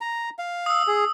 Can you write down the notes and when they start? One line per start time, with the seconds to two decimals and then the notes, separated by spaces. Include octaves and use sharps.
0.01 A#5
0.39 F5
0.66 D#6 E6
0.87 G#4